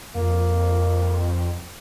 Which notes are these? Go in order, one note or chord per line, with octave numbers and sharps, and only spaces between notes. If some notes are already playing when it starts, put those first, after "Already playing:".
F2 A#3